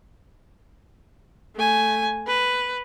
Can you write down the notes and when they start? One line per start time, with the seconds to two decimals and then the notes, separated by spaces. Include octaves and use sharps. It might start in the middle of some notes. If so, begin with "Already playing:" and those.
1.56 A3 G#5
2.28 B4